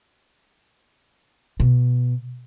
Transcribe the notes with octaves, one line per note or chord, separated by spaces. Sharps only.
B2